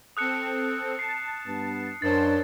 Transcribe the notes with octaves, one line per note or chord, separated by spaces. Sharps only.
C4 A4 D#6 F#6 C#7
A5 C7
G2 B3
F#2 D4 A#4 C5 C#5 A5 A6